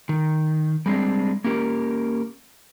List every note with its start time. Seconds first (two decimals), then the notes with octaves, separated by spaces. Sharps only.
0.09 D#3
0.86 G3 G#3 C4 D4
1.44 A#3 C#4 G4 A#4